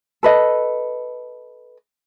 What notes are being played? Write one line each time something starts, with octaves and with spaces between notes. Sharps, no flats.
A4 B4 D#5